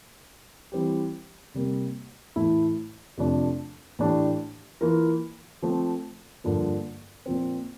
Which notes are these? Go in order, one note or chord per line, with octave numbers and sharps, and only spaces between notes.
E3 G3 C4 G4
C3 G3 A#3
A2 E3 A3 E4
F2 C3 F3 A3 D4
A2 E3 A3 D4 G4
E3 A#3 F4 A#4
F3 A3 C4
G2 D3 F3 A#3
A#2 F3 C4